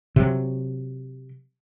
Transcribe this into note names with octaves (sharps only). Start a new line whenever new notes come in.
C3 F#3